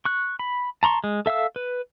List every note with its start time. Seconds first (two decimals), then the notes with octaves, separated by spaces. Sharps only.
0.05 C#6 F#6
0.39 B5
0.83 A5 A#5 C6 C#6
1.04 G#3
1.26 A4 E5 F5 E6
1.56 B4